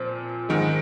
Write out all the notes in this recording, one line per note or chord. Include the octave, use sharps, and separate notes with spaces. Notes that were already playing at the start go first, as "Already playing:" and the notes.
Already playing: A#2 F3 C4
G#2 D#3 G#3